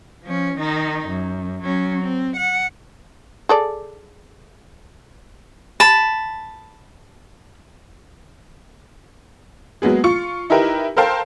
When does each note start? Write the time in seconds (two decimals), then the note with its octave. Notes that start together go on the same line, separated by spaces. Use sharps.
0.24 F3 C#4
0.59 D#3 D#4
1.09 F#2
1.63 F#3 C#4
2.02 C4
2.37 F#5
3.49 G#4 A4 D5
5.80 A5 B5
9.82 F#3 G#3 A#3 B3 G#4
10.04 F4 C#6 C#7
10.50 D#4 E4 G4 A#4 B4 E5
10.97 A4 A#4 C5 F5 G5 A5